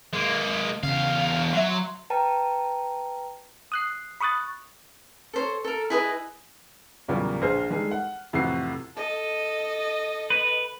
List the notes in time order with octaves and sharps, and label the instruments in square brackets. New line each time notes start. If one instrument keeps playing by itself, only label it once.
[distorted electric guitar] G#3 A#3
[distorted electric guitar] E2 F5 [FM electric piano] C#3
[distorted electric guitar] F#3 [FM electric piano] E5 C6
[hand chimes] B4 G5 A5 A#5
[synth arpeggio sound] D#6 F#6 C7
B5 C#6 D#6 F#6 A6
[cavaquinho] A4 C5 C#5
A4 A#4
E4 G#4 B4 D#5
[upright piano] E2 A#2 C#3 F#3 G3 A#3
A#1 G#4 C5 F6
G3 G#3 D#4 G#4 A4
F#5
F2 A2 C3 E3 F#4 C7
[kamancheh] A4 D#5
[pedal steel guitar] B4